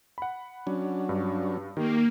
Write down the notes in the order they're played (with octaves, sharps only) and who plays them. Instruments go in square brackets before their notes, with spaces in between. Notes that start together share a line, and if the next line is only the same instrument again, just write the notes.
[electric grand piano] F#5 B5
[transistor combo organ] F#3 C#4 D4
[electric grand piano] G2
[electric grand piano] D#3 [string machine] A#3 [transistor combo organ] G4